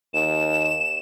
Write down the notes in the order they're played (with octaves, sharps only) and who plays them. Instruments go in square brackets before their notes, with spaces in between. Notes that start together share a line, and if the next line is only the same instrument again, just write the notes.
[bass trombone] D#2 [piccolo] E7